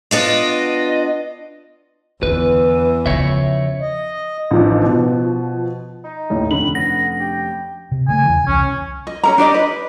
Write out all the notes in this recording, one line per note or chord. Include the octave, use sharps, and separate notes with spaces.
B3 D4 F4 D#5
E2 D3 E3 B4
C#3 F3 C#5 E5
D#5
A1 D#3 F3 D4
B2 F3
D#4
A1 D#2 A2
F1 D3 C#4 B5 F#7
B3 A#6
G4
C3
C#3 A3 G#5
E2 E3
C2 C#4
D#5
C#4 A#4 A#5
D4 G4 D5 D#5
B4